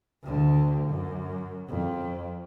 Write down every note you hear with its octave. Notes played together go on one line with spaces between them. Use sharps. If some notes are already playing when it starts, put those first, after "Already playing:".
D2 D3
F#2
F2